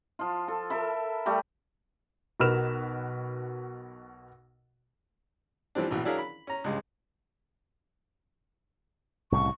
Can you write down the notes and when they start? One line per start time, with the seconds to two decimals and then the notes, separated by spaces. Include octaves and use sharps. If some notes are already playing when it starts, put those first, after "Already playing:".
0.19 F3 F4
0.48 A4
0.70 A4 A#4 E5 B5
1.26 G3 A3 A#5 B5
2.40 B1 B2 A#4 B4 F6 E7
5.75 E3 F3 G3 C4 D4
5.91 A#1 B2 E3
6.05 F#3 D4 E4 G#4 A#4 F5
6.18 B5
6.47 C#4 A#5
6.64 C#2 G2 G#3
9.32 C2 A2 C#3 C#6